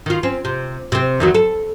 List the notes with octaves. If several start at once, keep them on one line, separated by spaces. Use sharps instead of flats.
D#3 F4
C4 C#4
C3
C3 C4
E2 D#3 F#3
A4